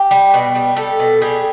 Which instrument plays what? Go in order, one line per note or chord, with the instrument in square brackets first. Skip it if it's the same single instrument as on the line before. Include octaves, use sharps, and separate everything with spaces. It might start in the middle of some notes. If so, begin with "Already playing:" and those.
Already playing: [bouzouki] G4
G3
B2
G3
G3 A4
B2
G3 G#4